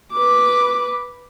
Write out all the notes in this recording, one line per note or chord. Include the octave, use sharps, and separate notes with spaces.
B4 D6